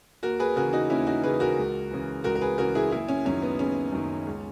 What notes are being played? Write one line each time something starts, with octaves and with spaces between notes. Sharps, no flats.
D#2 F#4 A#4
G#4 B4
C#3 E3 F#4 A#4
D#4 F#4
D#2 C#4 E4
D#4 F#4
C#3 E3 G#4 B4
F#4 A#4
C#2
C#3 E3
C#2 F#4 A#4
A#4
G#4 B4
C#3 E3 F#4 A#4
E4 G#4
F#1 E4 G#4
C#4
F#2 D#3 C#4
B3
F#1 C#4
F#2 D#3
C#2